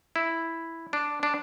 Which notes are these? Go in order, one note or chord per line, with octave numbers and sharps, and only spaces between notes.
E4
D4
D4